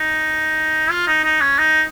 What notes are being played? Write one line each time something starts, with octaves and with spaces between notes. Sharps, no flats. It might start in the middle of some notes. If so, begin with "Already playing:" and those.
Already playing: D#4
F4
D#4
D#4
C#4
D#4